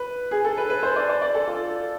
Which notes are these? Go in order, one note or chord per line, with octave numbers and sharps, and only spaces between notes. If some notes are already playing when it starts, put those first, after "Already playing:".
Already playing: B4
G#4
A4
B4
B4
C5
D5
D5
D5
A4
F4